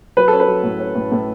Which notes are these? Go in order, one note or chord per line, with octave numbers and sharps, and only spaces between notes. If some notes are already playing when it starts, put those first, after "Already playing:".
F#3 B4
C#4 A4
B4
F#3
A2
C#4
A2
A2